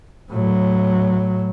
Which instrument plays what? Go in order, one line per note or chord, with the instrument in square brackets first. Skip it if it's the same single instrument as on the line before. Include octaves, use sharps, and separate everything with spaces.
[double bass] A2 F#3